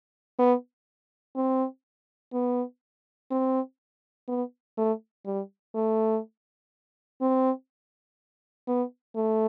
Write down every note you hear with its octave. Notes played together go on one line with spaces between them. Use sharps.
B3
C4
B3
C4
B3
A3
G3
A3
C4
B3
A3